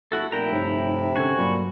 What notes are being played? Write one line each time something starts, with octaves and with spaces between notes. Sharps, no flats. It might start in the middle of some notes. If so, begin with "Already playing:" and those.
G1 A3 E4 F#4 A4
F1 A#2 E4 G5 A#5
G2 C3 D#4 C#5
D3 C#4 F#4 A4 G#5
G2 A#2 F#3 B5